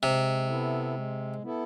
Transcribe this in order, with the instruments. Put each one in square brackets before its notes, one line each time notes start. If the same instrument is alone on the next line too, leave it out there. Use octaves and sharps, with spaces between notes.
[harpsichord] C3 [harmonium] G#3
[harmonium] B3 E4 A4
G#3
B3 E4 A4